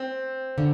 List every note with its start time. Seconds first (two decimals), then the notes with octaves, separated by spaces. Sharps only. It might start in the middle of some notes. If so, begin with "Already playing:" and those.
Already playing: C4
0.58 D3